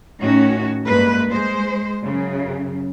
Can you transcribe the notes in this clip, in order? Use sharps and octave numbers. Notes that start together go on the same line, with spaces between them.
A2 D#3 C#4 F#4
G2 G#3 A#3 B4
G#3 C5
F#2 C#3